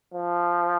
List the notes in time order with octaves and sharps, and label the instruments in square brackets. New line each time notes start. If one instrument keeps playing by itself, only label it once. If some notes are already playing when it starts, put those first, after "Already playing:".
[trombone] F3